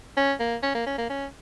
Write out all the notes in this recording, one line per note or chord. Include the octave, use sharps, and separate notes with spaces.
C#4
A#3
C#4
A#3
C#4
A#3
C#4